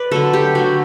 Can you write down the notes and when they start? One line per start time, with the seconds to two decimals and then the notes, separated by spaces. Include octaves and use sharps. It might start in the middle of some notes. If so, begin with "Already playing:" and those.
Already playing: B4 D5
0.11 D3 F#3 A3 A4
0.34 G4
0.55 D3 F#3 A3 F#4